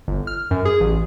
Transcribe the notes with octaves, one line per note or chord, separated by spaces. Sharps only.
G1
F6
F#2
G#4
A1